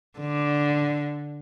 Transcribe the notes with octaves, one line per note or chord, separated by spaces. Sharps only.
D3